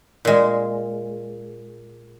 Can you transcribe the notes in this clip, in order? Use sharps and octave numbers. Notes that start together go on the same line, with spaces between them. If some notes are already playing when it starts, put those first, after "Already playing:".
A#2 G#3